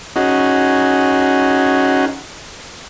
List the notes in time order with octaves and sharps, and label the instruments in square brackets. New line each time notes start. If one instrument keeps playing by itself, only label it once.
[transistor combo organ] C#4 D#4 F#4 G#4